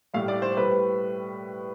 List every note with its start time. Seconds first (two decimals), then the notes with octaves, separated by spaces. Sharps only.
0.14 A2 G3 F5
0.28 D5
0.42 C5
0.57 A2 G3 B4